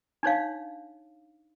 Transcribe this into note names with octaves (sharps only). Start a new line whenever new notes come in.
D4 D#4 C#5 F5